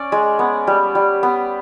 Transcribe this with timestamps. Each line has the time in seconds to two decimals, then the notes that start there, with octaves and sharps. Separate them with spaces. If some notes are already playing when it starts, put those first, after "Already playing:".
Already playing: C#4 D5
0.12 G#3
0.39 B3
0.67 G3
0.95 G3
1.23 B3